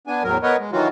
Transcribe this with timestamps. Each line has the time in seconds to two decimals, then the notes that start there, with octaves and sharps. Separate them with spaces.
0.07 B3 D4 G#5
0.24 E2 A2 F#3 A#4
0.43 B3 A#4 B4 C#5 D#5
0.59 G#3
0.72 D#3 E3 F#3 F4 F#4